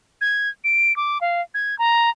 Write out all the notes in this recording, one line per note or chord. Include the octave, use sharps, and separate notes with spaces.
G#6
D7
D6
F5
G#6
A#5